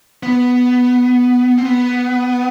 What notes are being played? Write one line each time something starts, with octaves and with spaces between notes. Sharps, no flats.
B3
C4
B3